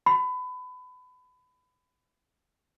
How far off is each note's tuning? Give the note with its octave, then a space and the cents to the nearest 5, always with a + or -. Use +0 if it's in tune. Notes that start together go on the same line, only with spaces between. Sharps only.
B5 +25